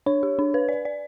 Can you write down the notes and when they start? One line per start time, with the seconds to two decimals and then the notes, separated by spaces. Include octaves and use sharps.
0.06 D4 C#5
0.23 G4
0.39 D4
0.54 B4
0.69 D5
0.85 D5